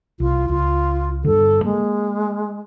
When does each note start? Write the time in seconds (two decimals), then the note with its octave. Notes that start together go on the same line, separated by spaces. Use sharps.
0.20 C2 F4
0.49 C#2 F4
1.25 G2 D3 A4
1.65 G#3 A#3